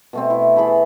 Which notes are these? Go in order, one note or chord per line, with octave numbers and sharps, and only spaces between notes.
B2 A3 C4
E4
E3 G#4 A5 B5